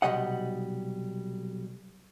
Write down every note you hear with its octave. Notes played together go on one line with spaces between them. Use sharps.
B1 G2 C3 G3 D#5 F#5